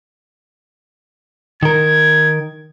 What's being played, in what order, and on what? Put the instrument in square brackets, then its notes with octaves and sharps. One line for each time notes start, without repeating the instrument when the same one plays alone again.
[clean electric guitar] D#3 A#4 [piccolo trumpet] G#6